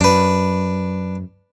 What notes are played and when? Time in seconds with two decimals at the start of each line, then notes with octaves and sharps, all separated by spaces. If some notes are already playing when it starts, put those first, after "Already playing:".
0.01 F#2 D4 B4